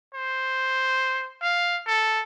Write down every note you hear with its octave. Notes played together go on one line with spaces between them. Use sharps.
C5
F5
A4